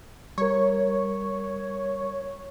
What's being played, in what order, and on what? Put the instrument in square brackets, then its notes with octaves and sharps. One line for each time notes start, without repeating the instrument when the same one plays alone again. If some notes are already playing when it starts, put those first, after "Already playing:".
[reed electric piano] G3 A#4 [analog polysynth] C#5